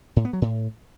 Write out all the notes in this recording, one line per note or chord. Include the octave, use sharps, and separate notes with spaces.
A2
B3
F#3
A2